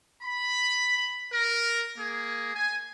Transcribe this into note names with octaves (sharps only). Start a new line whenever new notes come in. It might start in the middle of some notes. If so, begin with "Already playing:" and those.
B5
A#4
A#3 G#4
G#5